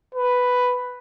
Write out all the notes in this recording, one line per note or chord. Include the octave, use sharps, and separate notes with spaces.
B4